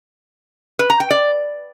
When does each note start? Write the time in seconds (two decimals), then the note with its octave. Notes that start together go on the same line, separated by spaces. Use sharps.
0.79 B4
0.90 A#5
1.00 G5
1.11 D5